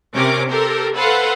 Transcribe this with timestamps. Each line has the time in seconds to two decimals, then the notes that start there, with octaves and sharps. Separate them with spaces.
0.15 C3 C4 C#4 A#4 D6
0.49 G4 A4 A#4 C5
0.94 A4 B4 C5 F5 F#5